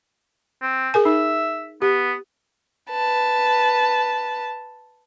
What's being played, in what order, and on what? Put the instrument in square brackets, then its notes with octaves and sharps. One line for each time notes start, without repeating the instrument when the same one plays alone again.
[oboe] C4
[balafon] G#4 A#4 G#5
[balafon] D#4 [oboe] E5
[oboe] B3 [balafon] G4
[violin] B4 A5